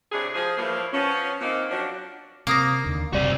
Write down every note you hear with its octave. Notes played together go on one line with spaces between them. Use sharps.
A2 C3 D4 G#4
F3 G#4
A2 E3 F3 G3 A#3
F3 B3 C#4
A#2 D#3 A#3 C4
F3 F#3 D4
C3 A#3 D6 D#6 A#6
D#2 D3
F#1 C3 G3 F#4 D5